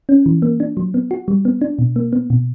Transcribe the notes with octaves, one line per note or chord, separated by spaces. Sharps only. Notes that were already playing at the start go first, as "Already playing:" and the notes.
C#4
E3
A#3
D4
F#3
B3
F#4
G3
B3
D4
B2
A#3
B3
B2